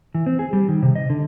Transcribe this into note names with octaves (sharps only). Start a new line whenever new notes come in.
E3
C4
G#4
G3
D#3
C3
D#5
D3